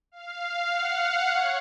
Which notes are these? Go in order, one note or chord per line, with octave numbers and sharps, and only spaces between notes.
F5
F#5
C#5